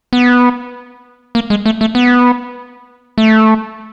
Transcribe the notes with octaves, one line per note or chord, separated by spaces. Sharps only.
B3
A#3
G#3
A3
A3
B3
A3